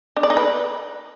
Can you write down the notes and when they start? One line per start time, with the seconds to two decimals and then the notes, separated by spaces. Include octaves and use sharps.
0.17 D4
0.23 D5
0.30 D#4
0.37 B4